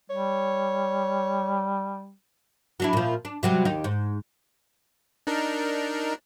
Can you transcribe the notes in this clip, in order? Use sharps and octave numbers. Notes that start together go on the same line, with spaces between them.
G3 C#5
F#3 D4 E4
A#2 F3
D4
C3 F#3 G3
D#2 D#4 G4
G#2
D4 D#4 A#4